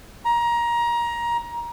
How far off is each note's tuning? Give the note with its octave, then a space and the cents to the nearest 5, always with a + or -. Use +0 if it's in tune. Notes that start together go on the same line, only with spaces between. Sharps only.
A#5 +20